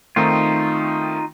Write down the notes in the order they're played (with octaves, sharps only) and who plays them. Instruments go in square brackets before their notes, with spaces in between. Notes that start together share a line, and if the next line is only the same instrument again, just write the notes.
[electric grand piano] D#3 A3 C4 [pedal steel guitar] D#4 F4